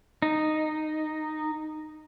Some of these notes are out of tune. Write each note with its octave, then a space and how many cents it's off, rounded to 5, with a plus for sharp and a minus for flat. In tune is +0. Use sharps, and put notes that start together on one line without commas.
D#4 -10